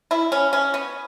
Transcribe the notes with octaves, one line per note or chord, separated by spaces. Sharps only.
E4
C#4
C#4
B3